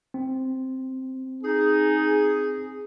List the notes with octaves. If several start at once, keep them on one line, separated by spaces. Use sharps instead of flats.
C4
D#4 G#4